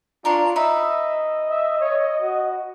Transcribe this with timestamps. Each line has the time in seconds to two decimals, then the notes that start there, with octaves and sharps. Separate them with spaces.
0.25 D4 F4 A#4 C#5 C6
0.56 D#4 B4 D#5 E5 B5
1.50 E5
1.80 C#5
2.21 F#4